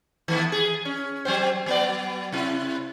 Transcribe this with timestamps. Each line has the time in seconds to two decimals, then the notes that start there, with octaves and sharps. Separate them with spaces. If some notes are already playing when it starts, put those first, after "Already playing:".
0.28 D#3 A3 B3
0.52 G#4
0.85 C#4
1.25 F#3 C4 C5
1.66 F#3 B3 D5
2.32 C3 E4